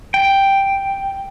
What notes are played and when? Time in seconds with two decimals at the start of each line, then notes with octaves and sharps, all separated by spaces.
0.14 G5